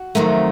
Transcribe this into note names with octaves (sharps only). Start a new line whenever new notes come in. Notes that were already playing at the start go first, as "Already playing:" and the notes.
Already playing: F#4
F2 C3 D#3 F#3 A3